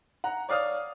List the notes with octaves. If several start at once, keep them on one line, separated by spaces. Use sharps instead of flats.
F#5 A#5
C#5 D5 F5 D#6 F6